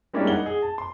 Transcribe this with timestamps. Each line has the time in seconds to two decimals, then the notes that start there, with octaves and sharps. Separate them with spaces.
0.13 G3 G#3 A#3 C#4 D4 E4
0.27 D#4 F#5 G7
0.46 G#4
0.62 A5
0.78 C6